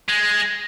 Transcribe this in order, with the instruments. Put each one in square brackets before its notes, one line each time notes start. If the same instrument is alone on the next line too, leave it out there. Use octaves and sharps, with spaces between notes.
[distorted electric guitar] G#3